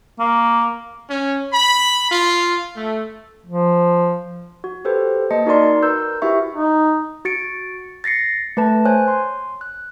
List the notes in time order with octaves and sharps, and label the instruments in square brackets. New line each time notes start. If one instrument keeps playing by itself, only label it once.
[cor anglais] A#3
[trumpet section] C#4
B5
F4
A3
[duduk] F3
[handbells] F#4
G4 A4 B4 C5
A#3 D#5 A5 C#7
D#4 F#4 A#4 D5 C6
A#4 B4 E6 G6
E4 F#4 G4 E5 C#6
[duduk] D#4
[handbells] F#4 A6 C#7 D7
A6 A#6 C7 C#7
A3 B4 A5
C5 C#5 G#5 F#6
C6
F#6